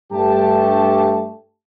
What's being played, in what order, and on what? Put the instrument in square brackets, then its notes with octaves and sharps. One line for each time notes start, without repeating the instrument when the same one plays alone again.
[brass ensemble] G2 A3 G4 A5